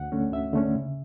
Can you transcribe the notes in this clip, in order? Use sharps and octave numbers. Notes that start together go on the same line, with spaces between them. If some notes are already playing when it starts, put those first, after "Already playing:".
Already playing: D2 F#5
D3 A3 C#4
D2 E5
D3 A3 C#4
C#3